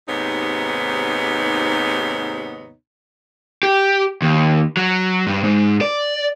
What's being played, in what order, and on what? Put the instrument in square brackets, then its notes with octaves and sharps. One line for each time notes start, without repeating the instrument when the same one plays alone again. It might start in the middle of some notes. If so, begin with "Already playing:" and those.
[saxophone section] D#2 G#2 C3 B3 D#4 C#5
[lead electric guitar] G4
D#2
F#3
G2
G#2
D5